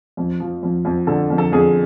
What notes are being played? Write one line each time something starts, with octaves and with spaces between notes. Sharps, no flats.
F2
F3
F2
F2
D3 A4
F2
A4
F2 G#4